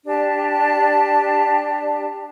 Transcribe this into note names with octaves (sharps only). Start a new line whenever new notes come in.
D4 G4 A5